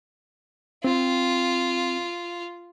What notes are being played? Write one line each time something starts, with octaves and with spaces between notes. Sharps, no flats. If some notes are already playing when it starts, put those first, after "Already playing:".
C4 F4